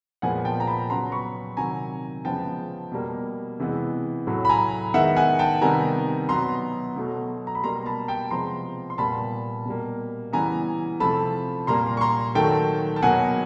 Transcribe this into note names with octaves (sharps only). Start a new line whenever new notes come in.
A#2 F3 G#3 B3 F#5 G#5
G5 A5
A#5
A5 B5
C#3 F#3 B3 A#5 C6
B5 C#6
C3 D#3 F#3 G#5 A#5
C#3 F3 G#3 B3 G5 A5
B2 G3 A#3
C3 E3 G#3 B3
A2 F#3 A3
B5
G#5 A#5
D#3 G#3 B3 E5 F#5
F#5 G#5
G5 A5
C3 D#3 G3 B3 G#5 A#5
B2 F#3 B3 A#5 C6
B2 F#3 A3
A#5
B5
B2 G3 A#3 A#5 C6
A5 B5
G5 A5
C3 F3 G#3 B3 A#5 C6
C6
A#2 G3 B3 A5 B5
B2 G3 A#3
C#3 E3 G3 B3 G#5 A#5
C3 F3 A3 A5 B5
A#2 G3 A#3 A#5 C6
C#6
A#5 C6
D#3 F#3 A3 G5 A5
A5
B2 F#3 A#3 F#5 G#5